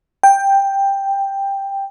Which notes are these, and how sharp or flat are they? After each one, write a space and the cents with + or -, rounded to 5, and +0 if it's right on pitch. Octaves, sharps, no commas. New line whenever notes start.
G5 +10